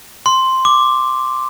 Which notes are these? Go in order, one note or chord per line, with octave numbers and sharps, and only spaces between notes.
C6
D6